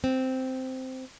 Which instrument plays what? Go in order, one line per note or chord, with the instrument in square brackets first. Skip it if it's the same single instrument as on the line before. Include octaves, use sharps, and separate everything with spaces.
[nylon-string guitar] C4